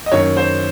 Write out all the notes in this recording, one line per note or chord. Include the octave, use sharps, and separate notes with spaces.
D#5
F#2 D#3 A#3 C#5
C5